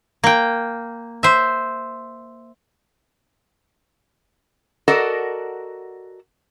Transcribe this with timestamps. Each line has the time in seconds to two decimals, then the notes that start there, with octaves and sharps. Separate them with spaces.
0.24 A#3 G5
1.23 C5 E5
4.88 F#4 A4 A#4 D5 D#5 F#5